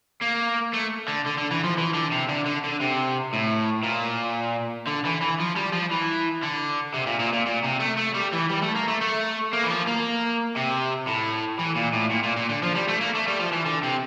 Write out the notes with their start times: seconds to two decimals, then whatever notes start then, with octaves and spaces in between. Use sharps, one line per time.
0.22 A#3
0.73 A3
1.08 D3
1.26 D3
1.38 D3
1.51 E3
1.64 F3
1.78 E3
1.94 D3
2.12 C3
2.29 D3
2.46 D3
2.64 D3
2.80 C3
3.33 A2
3.83 A#2
4.87 D3
5.05 E3
5.21 E3
5.40 F3
5.56 G3
5.73 F3
5.91 E3
6.43 D3
6.94 C3
7.06 A#2
7.19 A#2
7.33 A#2
7.46 A#2
7.64 C3
7.80 A3
7.97 A3
8.14 G3
8.33 E3
8.50 G3
8.62 A3
8.75 A#3
8.88 A3
9.01 A3
9.53 A#3
9.63 E3
9.70 F3
9.87 A#3
10.56 C3
11.07 A2
11.59 E3
11.76 A#2
11.93 A2
12.11 A#2
12.24 A#2
12.37 A#2
12.49 D3
12.63 F3
12.75 G3
12.88 A3
13.01 A#3
13.15 A3
13.28 G3
13.40 F3
13.52 E3
13.66 D3
13.83 C3